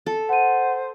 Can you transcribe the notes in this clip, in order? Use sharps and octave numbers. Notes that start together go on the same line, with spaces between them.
A4
C5 F#5 D#7